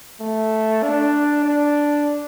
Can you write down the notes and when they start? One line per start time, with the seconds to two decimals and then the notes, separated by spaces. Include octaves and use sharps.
0.20 A3
0.83 D4
1.44 D4